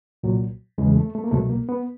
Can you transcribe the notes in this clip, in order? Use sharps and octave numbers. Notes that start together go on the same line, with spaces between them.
C2 A#2 F#3
E2 C#3 E3 G#3
A3
A3
A#3
C2 B2 F#3 A3
A#3
B3